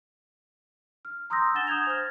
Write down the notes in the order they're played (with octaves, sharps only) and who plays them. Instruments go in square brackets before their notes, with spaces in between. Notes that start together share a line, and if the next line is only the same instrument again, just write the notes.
[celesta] F6
A#5 C6 D#6 E6 G6 A#6
D4 F#5 G#5 A6 E7 G7
D#6 G6 G#6 F7
C5 F6